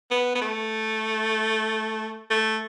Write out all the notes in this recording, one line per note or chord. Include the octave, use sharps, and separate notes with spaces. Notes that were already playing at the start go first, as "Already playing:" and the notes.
B3
B3
A3
A3